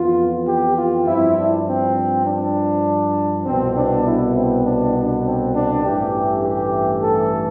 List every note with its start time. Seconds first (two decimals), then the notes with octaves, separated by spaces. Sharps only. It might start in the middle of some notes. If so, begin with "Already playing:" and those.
Already playing: F2 E3 B3 F4
0.48 G4
0.77 F4
1.07 G2 F3 C4 E4
1.37 D4
1.67 C4
2.27 D4
3.45 C2 B2 B3 C4
3.75 D4
4.05 E4
4.35 C4
4.64 D4
4.94 D4
5.24 C4
5.54 D4
5.83 A1 G2 E3 A3 G4
6.43 G4
7.03 A4